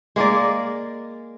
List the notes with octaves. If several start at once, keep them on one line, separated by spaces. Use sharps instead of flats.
G#3 A#3 A#4 D5